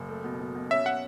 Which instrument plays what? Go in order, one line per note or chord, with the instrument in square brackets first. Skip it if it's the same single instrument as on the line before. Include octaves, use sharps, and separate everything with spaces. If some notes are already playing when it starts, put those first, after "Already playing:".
Already playing: [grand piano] F#1
A3
B2
B2
B2
[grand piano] C#4 [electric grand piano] E5
[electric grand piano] F#5